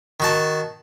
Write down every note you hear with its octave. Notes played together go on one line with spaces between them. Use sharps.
D#3 F#4 A5